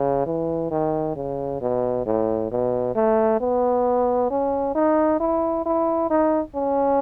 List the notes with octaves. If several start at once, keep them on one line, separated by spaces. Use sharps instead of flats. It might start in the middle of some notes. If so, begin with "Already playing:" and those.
Already playing: C#3
E3
D#3
C#3
B2
A2
B2
A3
B3
C#4
D#4
E4
E4
D#4
C#4